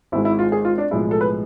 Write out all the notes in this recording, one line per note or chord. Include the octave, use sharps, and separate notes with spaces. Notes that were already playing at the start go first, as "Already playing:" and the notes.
G#1 G#2 G#3 E4
E4
F4
G#4
F4
D4
B1 A2 F3 G#3 E4
A4
B4